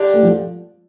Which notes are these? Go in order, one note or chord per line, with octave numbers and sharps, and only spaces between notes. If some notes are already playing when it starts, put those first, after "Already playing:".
Already playing: D3 G3 D4 G4
A3
F3